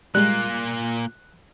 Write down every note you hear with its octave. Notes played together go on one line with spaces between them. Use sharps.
A#2 G3 G#3 A#3 F#6